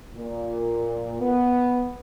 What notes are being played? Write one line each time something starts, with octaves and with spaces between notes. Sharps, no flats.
A#2
B3